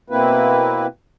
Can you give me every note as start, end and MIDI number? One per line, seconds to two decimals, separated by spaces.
0.10 0.87 47
0.10 0.87 58
0.10 0.87 60
0.10 0.87 64
0.10 0.87 71